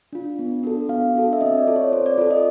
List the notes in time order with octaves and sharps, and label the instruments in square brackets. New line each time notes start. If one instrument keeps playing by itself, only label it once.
[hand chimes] D4 F4
B3
D4 F#4 A4
B3 F5
D4 F#4 A4
E5
C4 D#5
D5
F4 A4
C#5
C4 C5
D5
F4 A4 D5
D#5